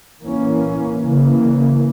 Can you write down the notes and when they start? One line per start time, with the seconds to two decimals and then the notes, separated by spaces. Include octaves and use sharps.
0.23 E3 A#3 C#4
1.03 C#3 E3 A#3